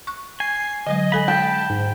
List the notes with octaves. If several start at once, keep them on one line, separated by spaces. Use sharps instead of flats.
C#6 F#6
G#5 C7
D3 F#3 G#3 D#5
G#3 A4 G#5 B5
G5 A5
G#2